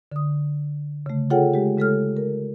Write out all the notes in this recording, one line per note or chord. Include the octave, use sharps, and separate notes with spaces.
D3 D#6
C#3 A3
F4 G#4 A4 C#5 F#5 G5
G#3 G4
C#3 G#3 A3 A4 C#5 F6
A#4